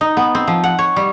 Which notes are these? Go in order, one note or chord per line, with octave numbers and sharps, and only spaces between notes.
D#4
B3
C4
F3
F#5
C#5
G3